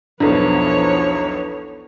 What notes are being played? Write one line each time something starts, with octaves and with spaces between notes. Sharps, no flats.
B1 E2 F3 B3 D4 A4 C#5